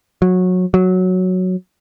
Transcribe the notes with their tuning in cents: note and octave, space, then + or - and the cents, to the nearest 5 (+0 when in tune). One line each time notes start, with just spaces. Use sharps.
F#3 -20
F#3 -5